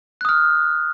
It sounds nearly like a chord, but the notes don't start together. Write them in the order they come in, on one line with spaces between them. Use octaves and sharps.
F#6 D#6 F6